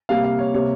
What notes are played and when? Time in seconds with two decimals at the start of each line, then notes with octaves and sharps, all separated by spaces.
0.09 C3 G3 A#3 F5
0.24 F5
0.39 C#5
0.54 C3 G3 A#3 C#5